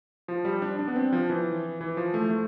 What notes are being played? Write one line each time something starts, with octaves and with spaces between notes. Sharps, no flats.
F3
G3
D4
D4
B3
C4
F3
E3
E3
F3
A3
A3